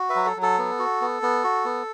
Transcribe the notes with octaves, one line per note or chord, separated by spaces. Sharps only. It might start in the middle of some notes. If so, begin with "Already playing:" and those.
Already playing: F#4
B4 E5
F#3
A4
F#3
A4
B3
F#4
B3
B3
F#4
B3